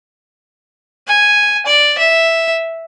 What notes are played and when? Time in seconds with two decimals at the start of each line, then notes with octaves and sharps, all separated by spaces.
1.07 G#5
1.66 D5
1.98 E5